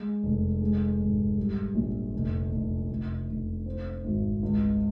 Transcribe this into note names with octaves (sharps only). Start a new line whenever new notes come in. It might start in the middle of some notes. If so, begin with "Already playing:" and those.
Already playing: G#3
F1
G#3
G#1
G3
A#1
F1
F1
F1
F1
C4
G#1
C#2